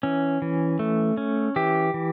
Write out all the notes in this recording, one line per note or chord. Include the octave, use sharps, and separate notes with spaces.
E3 C#4
E3
A3
C#4
E3 G4
E3